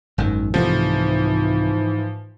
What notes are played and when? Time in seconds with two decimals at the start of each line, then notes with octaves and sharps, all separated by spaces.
0.18 G#1 F#2 D#3
0.54 C2 G#2 C3 E3 F3 A3